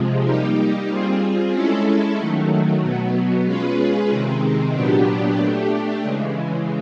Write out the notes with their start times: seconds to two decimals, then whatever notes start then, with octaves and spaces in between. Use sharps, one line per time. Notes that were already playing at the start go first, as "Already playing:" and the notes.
Already playing: C3 F3 G#3
0.24 G3 A#3 D#4 G4
0.88 G3 C4 F4 G#4
1.52 G#3 C#4 E4 A4
2.17 D#3 F#3 A3
2.82 B2 F#3 B3
3.45 G#3 C#4 F4 G#4 B4
4.10 C3 D#3 G#3 C4
4.74 A#2 F#3 B3 D4 G4
5.39 A3 D4 G4
6.03 C#3 E3 G#3